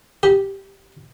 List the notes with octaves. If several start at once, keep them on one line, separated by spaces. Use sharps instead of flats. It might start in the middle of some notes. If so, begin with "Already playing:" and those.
G4